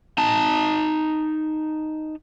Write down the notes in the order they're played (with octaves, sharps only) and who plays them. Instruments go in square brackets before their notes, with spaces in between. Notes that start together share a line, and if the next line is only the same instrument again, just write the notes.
[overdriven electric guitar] D#4 A5